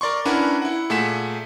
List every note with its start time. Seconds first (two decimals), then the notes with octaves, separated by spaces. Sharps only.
0.01 A#4 D5 C6 C#6
0.25 C#4 D4 E4 A#4 B4 F#5
0.62 E4 F#5
0.90 A#2 A3 G#4 F#5 B6 E7